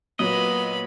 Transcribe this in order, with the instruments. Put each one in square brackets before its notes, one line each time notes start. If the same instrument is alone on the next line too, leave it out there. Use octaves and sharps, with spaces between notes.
[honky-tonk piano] A#2 F#3 [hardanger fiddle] B3 B5 [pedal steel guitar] D#5